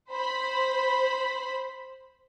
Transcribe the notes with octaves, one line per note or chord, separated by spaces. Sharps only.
C5 B5